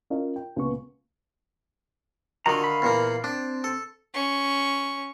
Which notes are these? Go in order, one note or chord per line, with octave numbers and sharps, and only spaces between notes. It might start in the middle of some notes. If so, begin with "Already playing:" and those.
C#4 F4 A#4 D#5 F5
G5
C#2 A#2 B3 B4 C#6
D3 D#3 F4 F#4 A#5
F5 B5
E2 A#2 A#3
C4 D4
A4
C#4 C#6